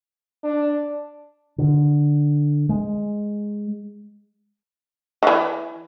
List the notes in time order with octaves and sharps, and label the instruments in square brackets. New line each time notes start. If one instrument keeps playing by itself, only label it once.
[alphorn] D4
[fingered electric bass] D3
G#3
[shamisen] D#3 E3